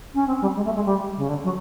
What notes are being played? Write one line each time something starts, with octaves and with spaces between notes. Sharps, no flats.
C#4
C4
G3
G#3
A3
G#3
G3
C#3
D3
F#3